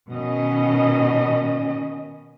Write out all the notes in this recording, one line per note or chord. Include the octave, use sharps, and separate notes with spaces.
B2 D#3 C#4 D#5